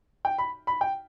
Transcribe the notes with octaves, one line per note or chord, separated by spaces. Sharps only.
G5
B5
B5
G5